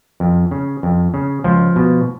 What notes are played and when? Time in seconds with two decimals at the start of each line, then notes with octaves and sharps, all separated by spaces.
0.20 F2
0.51 C#3
0.83 F2
1.14 C#3
1.44 C#2 F3
1.76 B2